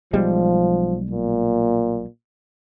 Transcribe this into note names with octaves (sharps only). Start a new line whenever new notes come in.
B1 F3 G3 G#3
A#2